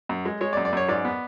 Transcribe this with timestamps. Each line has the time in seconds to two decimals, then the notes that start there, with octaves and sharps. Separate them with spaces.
0.09 F#2
0.25 G#3
0.41 G#3 C#5
0.53 D5
0.57 F#2
0.65 D5
0.73 F#2 C#5
0.89 G#2 D5
1.05 B3